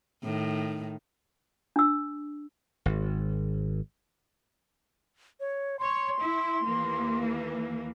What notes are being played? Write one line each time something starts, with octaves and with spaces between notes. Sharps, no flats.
A2 D#3
D4 E6
G#1
C#5
C#5 C6
E4
D#2 E3 A#3